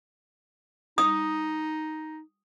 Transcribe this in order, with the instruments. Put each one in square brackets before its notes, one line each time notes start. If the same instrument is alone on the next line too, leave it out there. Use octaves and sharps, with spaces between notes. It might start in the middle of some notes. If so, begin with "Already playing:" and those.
[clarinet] D#4 [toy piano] D#6